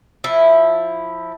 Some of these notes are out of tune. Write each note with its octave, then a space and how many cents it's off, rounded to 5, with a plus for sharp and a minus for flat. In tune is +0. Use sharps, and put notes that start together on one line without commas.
F3 +15 E4 +0